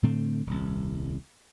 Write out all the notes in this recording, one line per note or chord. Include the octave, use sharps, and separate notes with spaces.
A2 D3 A3 C4
D#1 C2